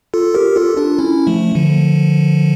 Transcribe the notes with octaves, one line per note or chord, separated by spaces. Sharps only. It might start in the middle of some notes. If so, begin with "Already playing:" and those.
F4 A4
G4 A#4
F4 A4
D4 F4
C#4 E4
F3 A3
D3 F3